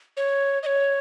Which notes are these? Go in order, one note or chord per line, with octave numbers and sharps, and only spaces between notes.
C#5
D#5
C#5